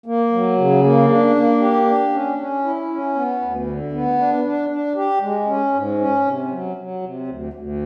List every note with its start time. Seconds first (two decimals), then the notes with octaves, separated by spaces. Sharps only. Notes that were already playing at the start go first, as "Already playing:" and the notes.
0.06 A#3
0.32 F#3
0.58 C#3
0.84 A#3
1.09 D4
1.36 A#3
1.60 G4
1.86 D4
2.13 C#4
2.38 C#4
2.64 E4
2.89 C#4
3.15 B3
3.41 D2
3.67 D3
3.92 B3
4.19 D4
4.45 D4
4.70 D4
4.95 G4
5.21 G#3
5.47 C#4
5.73 G#2
5.98 C#4
6.25 C3
6.51 F#3
6.77 F#3
7.02 C3
7.28 D2
7.53 D2